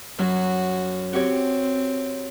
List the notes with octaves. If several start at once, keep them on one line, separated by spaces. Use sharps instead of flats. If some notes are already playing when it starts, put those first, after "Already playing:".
F#2 F#3 F#4
C4 F#4 G4 C#5